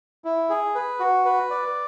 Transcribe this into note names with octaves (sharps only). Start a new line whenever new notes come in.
E4
G#4
B4
F#4
B4
D5